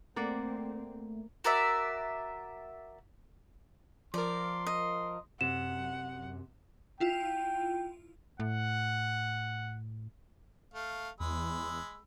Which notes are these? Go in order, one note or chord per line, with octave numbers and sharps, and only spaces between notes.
A3 A#3 C4 D5 F#5
F#4 A#4 D5 E5
F3 A#4 D5 C6
D#5
F#2 C3 F#5 E7
E4 F4 G5
A2 F#5
A3 F5
E2 G#3 B5 E6